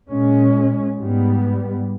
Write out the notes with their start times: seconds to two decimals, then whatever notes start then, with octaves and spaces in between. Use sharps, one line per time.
0.09 A#2 G#3 C#4
0.98 G#2 G3 B3